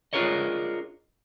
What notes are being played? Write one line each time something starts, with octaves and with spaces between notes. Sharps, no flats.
D4 F4 G#4 A#4 C#5 D#5